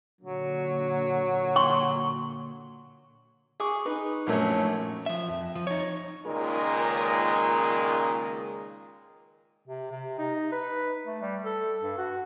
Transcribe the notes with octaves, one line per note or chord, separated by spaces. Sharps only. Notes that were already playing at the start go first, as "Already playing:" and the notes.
A#2 D3 F#3 A#3
C6 C#6
G#4 C#6 D6
D#4 B4
A#1 F#2 A3 C#4
F3 E5
F2
F3
D#4 C#5
C#2 A#2 D#3 G#3 D#4 A#4
C3
C3
D#4
B4
A3
G3
A4
G2
F#4